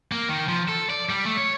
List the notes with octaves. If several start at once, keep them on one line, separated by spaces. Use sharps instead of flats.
A#3
D#3
F3
A4
D5
G3
A3
C#5